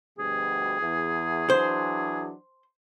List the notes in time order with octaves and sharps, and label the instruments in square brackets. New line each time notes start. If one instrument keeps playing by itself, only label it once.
[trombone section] D2 B2 G3 [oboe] G#4
[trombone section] E2
[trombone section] E3 F#3 D4 [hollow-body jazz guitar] C5